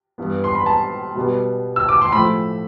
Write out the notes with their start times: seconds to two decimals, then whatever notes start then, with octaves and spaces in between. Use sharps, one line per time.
0.18 G2 E3 B3
0.44 C6
0.55 B5
0.66 A5
1.15 B2 G3 B3
1.76 E6
1.89 D6
2.02 C6
2.12 A2 F3 A3 B5